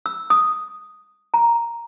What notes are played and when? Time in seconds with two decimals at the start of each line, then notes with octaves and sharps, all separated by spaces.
0.06 E6
0.30 D#6
1.34 A#5